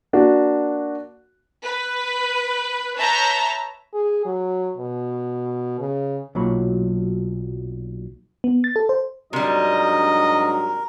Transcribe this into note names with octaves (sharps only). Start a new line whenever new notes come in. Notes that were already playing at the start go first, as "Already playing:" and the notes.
A#3 D4 F#4
B4
B4 C#5 E5 A5 A#5 G6
G#4
F#3
B2
C#3
B1 A#2 F#3 C#5 B5
B3
A6
A4
C5
G#2 C3 F#3 G3 D4 A#4 D#5